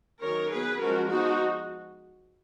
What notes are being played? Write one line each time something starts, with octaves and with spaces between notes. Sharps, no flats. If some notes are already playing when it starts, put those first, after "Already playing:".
D#3 F#3 C#4 A#4 C#5
F#3 B3 G#4 B4
F3 G#3 C#4 F#4 A#4
F3 G#3 B3 D#4 F#4